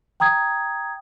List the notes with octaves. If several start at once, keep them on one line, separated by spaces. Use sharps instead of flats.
G5 A#5 D#6 G#6